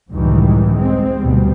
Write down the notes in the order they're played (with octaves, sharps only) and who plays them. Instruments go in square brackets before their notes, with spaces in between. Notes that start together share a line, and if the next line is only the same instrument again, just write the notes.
[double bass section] C#2 F#2 A2 D#3 E3 G3
G#3 C4
D2 B2 G3